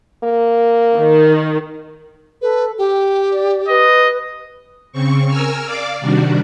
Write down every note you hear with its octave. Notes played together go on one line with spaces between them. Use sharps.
A#3
D#3
A4 B4
G4 G5
D5
B4 D#5
C#3 C4 C#6
A#4 G#5 E6 F6
D5 F5 D6
C3 D#3 G3 D4 F#4